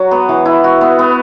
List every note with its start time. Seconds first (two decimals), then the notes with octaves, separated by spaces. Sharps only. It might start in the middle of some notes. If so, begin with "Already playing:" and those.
Already playing: F#3 F#4
0.11 B3
0.29 E3
0.45 E4
0.64 F#4
0.81 B3
0.99 B3